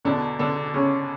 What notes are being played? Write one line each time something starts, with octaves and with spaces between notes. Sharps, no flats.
E2 B2 D3 D4
D3 D4
C#3 C#4